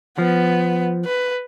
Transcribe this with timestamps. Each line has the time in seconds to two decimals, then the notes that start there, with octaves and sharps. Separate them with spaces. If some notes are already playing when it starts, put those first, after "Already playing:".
0.18 F3 B3
1.05 B4